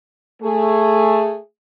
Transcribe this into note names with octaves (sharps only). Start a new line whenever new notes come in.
A3 G#4